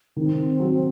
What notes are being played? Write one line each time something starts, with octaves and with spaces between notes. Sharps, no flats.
D#3 C4
F#3